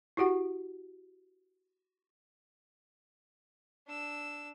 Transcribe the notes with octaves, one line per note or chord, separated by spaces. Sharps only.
E4 F#4 G4 F#5
D4 E6